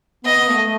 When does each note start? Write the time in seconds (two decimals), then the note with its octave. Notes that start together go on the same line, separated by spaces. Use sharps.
0.24 B3 D#5
0.37 B3
0.50 A3
0.63 A3